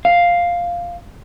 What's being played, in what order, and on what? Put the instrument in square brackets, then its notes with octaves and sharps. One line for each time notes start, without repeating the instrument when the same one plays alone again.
[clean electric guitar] F5